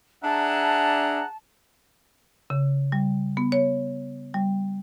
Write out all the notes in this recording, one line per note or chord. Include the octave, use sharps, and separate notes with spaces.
D4 G#4 E5 F#5 A5 A#5
C#3
G3
B3
C#5
G3